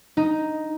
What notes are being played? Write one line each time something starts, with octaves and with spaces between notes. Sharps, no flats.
D#4